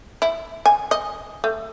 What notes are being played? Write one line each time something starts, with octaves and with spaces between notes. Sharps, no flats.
E4
G#5
D#5
A3